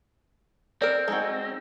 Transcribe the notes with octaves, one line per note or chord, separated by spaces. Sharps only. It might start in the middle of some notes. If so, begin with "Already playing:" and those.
C4 A#4 D5
G#3 D#4 F#4